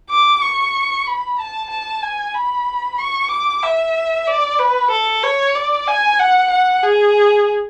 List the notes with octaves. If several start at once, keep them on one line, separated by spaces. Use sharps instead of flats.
D6
C#6
B5
A5
A5
G#5
B5
C#6
D6
E5
D5
B4
A4
C#5
D5
G#5
F#5
F#5
G#4